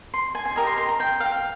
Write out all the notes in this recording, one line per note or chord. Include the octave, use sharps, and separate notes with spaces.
C6
G#5
G#5
G4 A#4 D#5 A#5
C6
C6
A#5
G5
F5